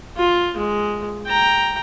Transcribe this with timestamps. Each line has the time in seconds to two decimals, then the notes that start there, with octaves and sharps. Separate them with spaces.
0.17 F4
0.57 G#3
1.27 G5 A#5